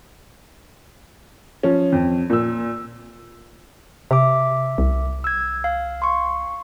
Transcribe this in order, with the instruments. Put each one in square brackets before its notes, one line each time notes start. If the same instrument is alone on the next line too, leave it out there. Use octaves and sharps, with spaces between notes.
[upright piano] F3 C#4
F2
A#2 E6
[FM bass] C3 [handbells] E5 D6
[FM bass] C2
[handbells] E6 G#6
F5
C6 C#6